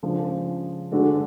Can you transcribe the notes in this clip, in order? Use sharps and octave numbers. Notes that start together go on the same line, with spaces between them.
C#3 F3 G#3 D4
D3 G#3 D4 F#4 A4